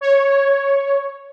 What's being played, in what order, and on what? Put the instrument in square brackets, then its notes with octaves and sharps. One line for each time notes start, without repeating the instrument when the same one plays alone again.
[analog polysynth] C#5